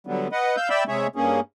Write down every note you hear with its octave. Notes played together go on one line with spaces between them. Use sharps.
D3 F#3 G3 B3
B4 D#5 F#5
F5 E6 G6
D5 E5 G5 B5 E6
C3 G#3 G#4 C#5 E5
G2 A#3 C#4 G#4